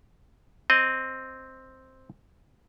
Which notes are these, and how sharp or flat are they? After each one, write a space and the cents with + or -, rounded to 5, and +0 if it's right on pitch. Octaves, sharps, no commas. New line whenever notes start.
C4 +0 D#5 +0